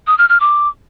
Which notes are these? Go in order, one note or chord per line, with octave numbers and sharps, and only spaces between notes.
D#6
F6
F6
D6